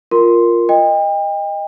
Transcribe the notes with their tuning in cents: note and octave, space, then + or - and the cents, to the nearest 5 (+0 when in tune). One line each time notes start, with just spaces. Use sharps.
F4 +0 A#4 +0 C6 +0
D#5 +0 G5 +35